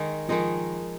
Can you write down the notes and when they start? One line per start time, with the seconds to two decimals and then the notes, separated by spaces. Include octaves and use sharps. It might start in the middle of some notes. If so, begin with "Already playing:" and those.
Already playing: D#3 G#3 D#4
0.28 D#3 F3 G#3 D#4